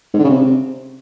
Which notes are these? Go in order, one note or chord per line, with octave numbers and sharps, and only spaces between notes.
G#2
D3
C#3
C3